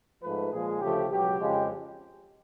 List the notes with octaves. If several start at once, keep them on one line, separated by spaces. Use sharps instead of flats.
G#2 F3 A3 B4
A#2 F3 G#3 G#4
D2 C#3 F3 A3 G4
C#2 B2 F#3 G4
F2 C#3 F3 G#3